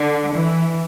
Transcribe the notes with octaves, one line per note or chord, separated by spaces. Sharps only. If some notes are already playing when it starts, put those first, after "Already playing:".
Already playing: D3
E3